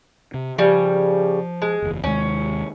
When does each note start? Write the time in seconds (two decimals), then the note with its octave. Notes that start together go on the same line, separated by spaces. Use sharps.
0.34 C3
0.58 C#3 F3 G3
1.62 G#3
1.82 F#1 E2
2.04 D#2 C3 G#3 C#4